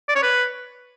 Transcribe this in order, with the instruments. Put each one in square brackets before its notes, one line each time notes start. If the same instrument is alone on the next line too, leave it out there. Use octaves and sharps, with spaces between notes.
[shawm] D5
C#5
B4